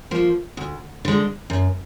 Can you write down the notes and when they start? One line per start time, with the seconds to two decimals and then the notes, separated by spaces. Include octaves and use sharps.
0.11 F3 A#3
0.57 D2
1.05 D3 G#3
1.50 F#2